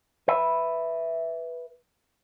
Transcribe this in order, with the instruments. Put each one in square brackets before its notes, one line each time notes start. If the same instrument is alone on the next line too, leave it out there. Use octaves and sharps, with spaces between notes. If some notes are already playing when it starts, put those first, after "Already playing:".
[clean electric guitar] B4 E5